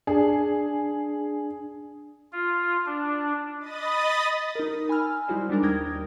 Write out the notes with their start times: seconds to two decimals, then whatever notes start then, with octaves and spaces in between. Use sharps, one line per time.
0.07 D4 G#4
2.32 F4
2.86 D4
3.60 D#5 B5 D#6 A6
4.55 D#4 A#4
4.89 G#5 B5 E6 F6
5.28 G3 D#4 E4 F#4 C5 D5
5.49 G3 G#3 D4 A#4
5.63 D#2 A#4 G5 D#6 G#6 A#6